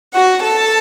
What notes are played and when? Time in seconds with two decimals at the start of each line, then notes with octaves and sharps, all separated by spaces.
0.14 F#4 F#5
0.43 A4 A5